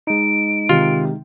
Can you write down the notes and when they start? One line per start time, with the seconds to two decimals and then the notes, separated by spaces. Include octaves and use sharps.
0.07 G#3 D#4 D7
0.69 C3 D#3 F4